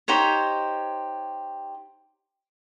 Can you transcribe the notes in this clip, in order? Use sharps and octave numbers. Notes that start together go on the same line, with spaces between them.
D#4 G4 C5 C#5